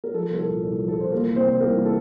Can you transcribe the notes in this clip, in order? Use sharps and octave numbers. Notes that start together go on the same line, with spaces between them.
A#4
F3 A4
C2 A#4
A4
A#2
C2 A4
F3
A4
C2 C5
E3 A#3 A#4
C2
C4 C5
C3
C5
C2 A#3 A#4
E3
A4